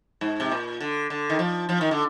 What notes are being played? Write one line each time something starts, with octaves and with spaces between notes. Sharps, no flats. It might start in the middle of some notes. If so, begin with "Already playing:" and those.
G#2
C3
A#2
D3
D3
D#3
F3
F3
D#3
D3